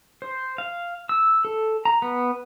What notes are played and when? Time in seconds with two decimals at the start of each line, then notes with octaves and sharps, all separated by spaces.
0.22 C5
0.58 F5
1.09 E6
1.45 A4
1.85 A#5
2.02 B3